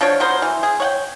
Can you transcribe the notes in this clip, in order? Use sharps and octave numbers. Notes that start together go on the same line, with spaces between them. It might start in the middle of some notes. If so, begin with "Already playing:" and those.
F3 D4 F#4 C#5
F#3 B3 A#4 C5
E3
G#4
C#5 F#5 G5